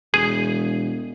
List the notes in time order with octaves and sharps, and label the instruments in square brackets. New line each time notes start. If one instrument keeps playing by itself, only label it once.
[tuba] E1 [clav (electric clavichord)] G#4